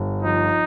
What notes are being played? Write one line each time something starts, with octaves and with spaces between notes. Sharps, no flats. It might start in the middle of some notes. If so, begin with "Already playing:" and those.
Already playing: G1
F3 D#4